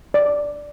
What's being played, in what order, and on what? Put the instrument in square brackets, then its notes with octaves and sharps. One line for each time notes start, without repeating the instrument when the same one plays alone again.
[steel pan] D5